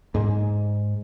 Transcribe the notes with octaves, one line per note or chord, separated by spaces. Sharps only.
G#2 G#3